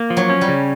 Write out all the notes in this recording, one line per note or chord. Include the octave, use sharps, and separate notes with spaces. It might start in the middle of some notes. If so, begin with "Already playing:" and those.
Already playing: A#3
F3
F#3
C#4
G3
C#3